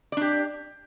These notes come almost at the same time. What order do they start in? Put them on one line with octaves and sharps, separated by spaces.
D5 D4 G4